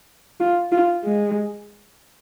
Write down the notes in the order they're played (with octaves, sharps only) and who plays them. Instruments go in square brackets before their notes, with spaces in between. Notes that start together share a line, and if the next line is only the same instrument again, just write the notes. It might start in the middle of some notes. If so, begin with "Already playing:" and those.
[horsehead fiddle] F4
F4
G#3